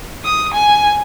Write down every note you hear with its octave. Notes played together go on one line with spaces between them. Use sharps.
D#6
G#5